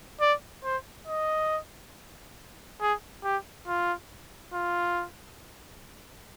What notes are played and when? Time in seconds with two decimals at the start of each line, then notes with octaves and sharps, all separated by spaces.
0.21 D5
0.64 C5
1.07 D#5
2.81 G#4
3.24 G4
3.67 F4
4.54 F4